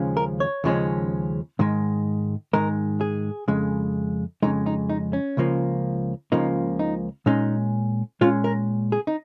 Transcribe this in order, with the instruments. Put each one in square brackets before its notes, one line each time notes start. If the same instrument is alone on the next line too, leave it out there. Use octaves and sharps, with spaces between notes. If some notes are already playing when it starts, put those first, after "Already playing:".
Already playing: [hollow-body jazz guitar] D#2 C#3 F3 G#3 C#4
A#4
C#5
D#2 C#3 F3 G#3 C#4
G#2 D#3 G#3
G#2 D#3 G#3 A#4
G#4
F2 C#3 G#3
F2 C#3 G#3 D#4
D#4
D#4
C#4
C#2 C#3 F3 A#3
C#2 C#3 F3 A#3 D#4
D#4
A#2 G#3 C#4 D#4
A#2 G#3 C#4 F4
A#4
G#4
D#4